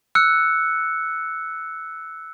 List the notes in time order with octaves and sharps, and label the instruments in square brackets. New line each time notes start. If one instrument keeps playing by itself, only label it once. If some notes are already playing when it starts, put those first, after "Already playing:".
[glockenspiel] E6 F#6 C#7